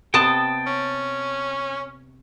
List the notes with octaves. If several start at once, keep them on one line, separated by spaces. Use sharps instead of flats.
C3 B3 D#5 G5 A5
C#4